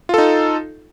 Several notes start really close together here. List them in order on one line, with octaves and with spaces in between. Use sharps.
F4 A4 D#4